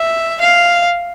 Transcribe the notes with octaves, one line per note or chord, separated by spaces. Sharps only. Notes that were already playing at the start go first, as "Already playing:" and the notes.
Already playing: E5
F5